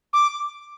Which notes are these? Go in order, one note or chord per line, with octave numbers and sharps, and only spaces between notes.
D6